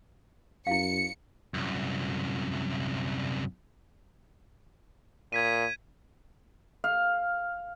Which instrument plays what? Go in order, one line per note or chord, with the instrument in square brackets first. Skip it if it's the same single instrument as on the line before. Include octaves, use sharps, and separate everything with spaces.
[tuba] F#2 [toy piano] E4 F5 [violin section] C#7
[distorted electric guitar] C2 F#2
[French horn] A#2 [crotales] G#6 B6 D#7
[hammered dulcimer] F5